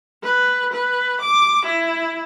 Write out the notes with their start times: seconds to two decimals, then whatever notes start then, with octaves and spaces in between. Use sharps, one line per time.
0.23 B4
0.72 B4
1.21 D6
1.65 E4